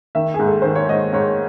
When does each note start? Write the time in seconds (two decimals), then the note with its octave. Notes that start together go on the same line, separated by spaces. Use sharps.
0.15 D#3 E5
0.34 G#4
0.39 G#2
0.48 A4
0.62 D#3 C5
0.75 C#5
0.88 G#2 D#5
1.13 G#2 C#5